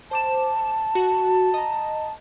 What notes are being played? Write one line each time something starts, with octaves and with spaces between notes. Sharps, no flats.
C5 A5 D6 E7
F#4
D#5 A#5